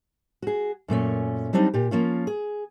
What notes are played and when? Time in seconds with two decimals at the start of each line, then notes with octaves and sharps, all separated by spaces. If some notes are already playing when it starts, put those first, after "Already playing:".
0.42 F#4 G#4
0.88 F#2 A#2 A3 C#4
1.53 F#3 G3 C4 D4 D#4
1.74 A#2 G4
1.91 F3 A#3 C#4 F4
2.27 G#4